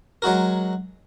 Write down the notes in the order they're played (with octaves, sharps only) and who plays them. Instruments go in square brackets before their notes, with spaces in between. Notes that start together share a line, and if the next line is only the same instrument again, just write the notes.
[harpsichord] F#3 G#3 F#4 A#4